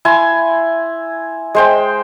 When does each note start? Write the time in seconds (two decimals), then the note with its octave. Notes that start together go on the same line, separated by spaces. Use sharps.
0.05 E4 G#5 C6
1.55 G#3 C5 G5